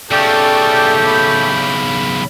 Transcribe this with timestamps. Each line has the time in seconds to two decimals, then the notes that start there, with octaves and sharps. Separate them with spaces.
0.11 B1 C#3 A3 G4 A4 D5 G5
1.07 B5